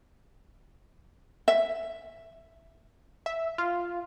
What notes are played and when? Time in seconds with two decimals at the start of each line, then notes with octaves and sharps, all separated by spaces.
1.48 E5
3.26 E5
3.58 F4